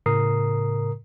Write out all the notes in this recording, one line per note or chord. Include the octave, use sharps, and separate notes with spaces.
A2 C#3 A#4 A#5 D#6 C7